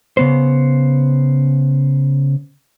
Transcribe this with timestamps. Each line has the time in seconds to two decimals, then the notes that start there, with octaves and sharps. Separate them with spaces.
0.17 C#3 B3 C5